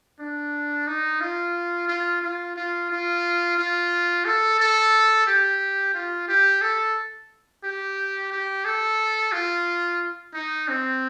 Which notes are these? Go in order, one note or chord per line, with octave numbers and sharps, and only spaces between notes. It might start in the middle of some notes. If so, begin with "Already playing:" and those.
D4
D#4
F4
F4
F4
F4
F4
F4
A4
A4
G4
F4
G4
A4
G4
G4
A4
F4
D#4
C4